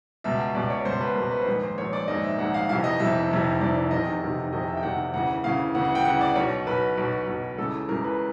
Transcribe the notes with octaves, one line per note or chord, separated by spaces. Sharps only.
C#2 B2 E5
C#2 B2 D5
C#5
C#2 B2 C5
B4
C#2 B2 A#4
B4
C5
A#1 G#2 D#3 B4
C5
A#1 G#2 D#3 C#5
D5
A#1 G#2 D#3 D#5
E5
A#1 G#2 D#3 F#5
F5
F1 F2 C3 E3 F5
D#5
F1 F2 C3 E3 E5
F1 F2 C3 E3
F1 F2 C3 E3 D5
F1 E2 C3 D#3 D#5
F1 E2 C3 D#3
F1 E2 C3 D#3 D#5
E5
G5
F1 E2 C3 D#3 F#5
D2 C#3 E3 F#5
D2 C#3 E3 F5
D2 C#3 E3 F#5
F#5
G5
D2 C#3 E3 F#5
D5
B1 B2 C#5
B1 B2 B4
B1 B2
B1 B2
C#2 C#3 E3 A4
C#2 C#3 E3 A#4
B4